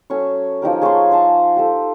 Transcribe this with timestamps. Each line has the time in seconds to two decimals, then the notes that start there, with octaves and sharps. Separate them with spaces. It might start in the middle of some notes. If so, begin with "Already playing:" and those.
0.10 F#3 C#4 A4 C#6
0.62 F3 D#4 G4 A#4
0.82 G#4 C#5 A5 C6
1.11 C5 G#5 A5
1.57 G4 A4